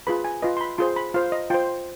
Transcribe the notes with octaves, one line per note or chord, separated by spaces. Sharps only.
F4 G#4 B4 B5
G#5
F4 B4 D#5
C6
B5
F4 G#4 C5 C6
B5
F4 C5 F5
D#5
F4 C5 G5